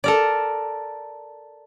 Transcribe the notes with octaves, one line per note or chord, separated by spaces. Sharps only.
A4 A#4 D5